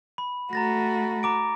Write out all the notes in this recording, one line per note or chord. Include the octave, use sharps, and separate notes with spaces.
B5
A3 F#4 A#5 A6 A#6
A#5 D6 D7